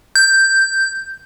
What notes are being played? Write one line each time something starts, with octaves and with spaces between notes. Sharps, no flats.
G6